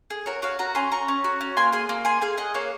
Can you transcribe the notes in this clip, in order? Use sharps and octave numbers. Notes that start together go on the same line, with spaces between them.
G#4
F#4 A#4 C#5
F#4 C#5 F5
F#4 F#5 A#5
C#4 G#5 C6
C#4 A#5 C#6
C#4
F#4
C#4
A#3 G#5 C6
G#4 G#5 C6
A#3
G#4 G#5 C6
G#4 F5 G#5
G#4 D#5 F#5
A#3 C#5 F5